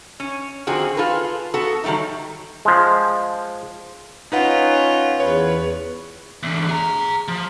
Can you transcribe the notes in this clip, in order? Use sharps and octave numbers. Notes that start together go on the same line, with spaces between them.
C#4
D3 D#3 F3 C4 F#4 G#4
F4 G#4 A4 B4
B3 F#4 A4
D#3 F#3 G3 A3 D#4
F3 G#3
C#4 D#4 F4 B4 F#5
E2 B4 C#5
E2 D3
G#4 A#5
F3